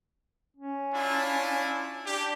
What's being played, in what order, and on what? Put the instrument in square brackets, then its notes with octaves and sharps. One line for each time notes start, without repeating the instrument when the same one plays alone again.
[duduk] C#4
[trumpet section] D4 E4 F4
[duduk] D4 [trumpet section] G4